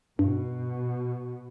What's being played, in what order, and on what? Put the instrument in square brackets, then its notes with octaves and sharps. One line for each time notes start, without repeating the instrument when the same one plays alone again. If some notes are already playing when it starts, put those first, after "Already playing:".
[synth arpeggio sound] G2 [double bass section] B2